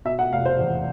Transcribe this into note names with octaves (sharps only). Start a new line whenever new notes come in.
B2 E5
F#5
F1 F5
C5
E2